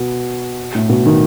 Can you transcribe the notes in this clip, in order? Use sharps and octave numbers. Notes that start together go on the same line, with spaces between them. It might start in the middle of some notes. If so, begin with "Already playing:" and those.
Already playing: B2
A2
B2
D#3